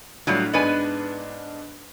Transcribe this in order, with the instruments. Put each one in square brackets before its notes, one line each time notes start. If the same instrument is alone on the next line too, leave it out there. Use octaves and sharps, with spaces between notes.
[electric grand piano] A2 D4 [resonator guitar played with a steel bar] F#3 G3 F4
[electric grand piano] G#2 D4 D#5 [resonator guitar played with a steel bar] B3 B4 G#5